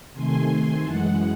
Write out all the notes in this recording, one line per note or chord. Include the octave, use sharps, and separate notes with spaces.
C3 D#3 A3 G#5 C6
G#5 C6
F#2 E3 G#3 F#5 A5